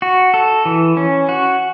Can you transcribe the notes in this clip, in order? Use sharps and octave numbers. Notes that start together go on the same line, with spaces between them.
F#4
A4
E3
C#4
F#4